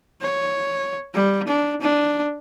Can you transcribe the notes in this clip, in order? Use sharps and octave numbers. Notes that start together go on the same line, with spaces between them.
C#5
G3
D4
D4